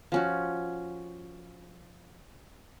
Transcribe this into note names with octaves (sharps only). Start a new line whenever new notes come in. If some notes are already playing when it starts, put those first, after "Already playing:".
F3 C#4 F#4